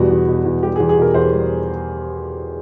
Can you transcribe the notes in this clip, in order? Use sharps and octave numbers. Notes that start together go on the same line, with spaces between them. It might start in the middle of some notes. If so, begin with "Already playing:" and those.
Already playing: E2 B2 G3 F#4
E2
B2
E2
G3 G4
E2 G#4
G#4
B2 A#4
E2 C5
G3